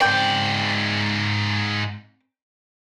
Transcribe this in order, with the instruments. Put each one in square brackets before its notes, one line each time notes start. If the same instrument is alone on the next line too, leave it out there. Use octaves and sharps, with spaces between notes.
[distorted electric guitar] G#2 D5 [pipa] C4 G5